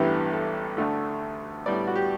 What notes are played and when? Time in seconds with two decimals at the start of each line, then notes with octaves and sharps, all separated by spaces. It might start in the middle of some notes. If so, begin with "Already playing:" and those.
Already playing: A1 G2 E3 B3 G4
0.33 A4
0.77 D2 D3 A3
1.66 A2 G3 B3 D5
1.87 F#4
1.96 G4